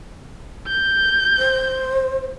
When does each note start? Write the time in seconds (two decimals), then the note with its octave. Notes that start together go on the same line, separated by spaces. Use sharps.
0.67 G6
1.39 C5